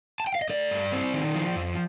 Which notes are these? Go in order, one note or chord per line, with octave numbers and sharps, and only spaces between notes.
A5
G5
F5
D#5
A3 D5
G2
C4
D#3
F3
F2